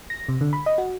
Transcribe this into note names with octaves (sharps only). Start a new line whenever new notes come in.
A#6
C3
D3
B5
D#5
F#4